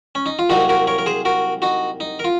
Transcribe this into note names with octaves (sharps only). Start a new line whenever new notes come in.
C#4
D#4
F4
C2 C3 F#3 A#3 D#4 F#4
F#4 A#4
A#4 C#5
A#4
G#4 C5
F#4 A#4
D#4 F#4
D#4
A#4
F4